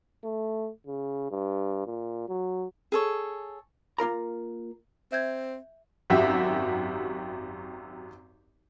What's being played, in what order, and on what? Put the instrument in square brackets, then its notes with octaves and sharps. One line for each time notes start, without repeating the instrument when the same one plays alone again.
[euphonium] A3
C#3
G2
A#2
F#3
[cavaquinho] G#4 A4 C#5
[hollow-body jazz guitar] A#3 F4 A#4 A#5
[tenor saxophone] C4 [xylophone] E5 G6 G#6
[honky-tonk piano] G#1 F#2 F#4 G4 E5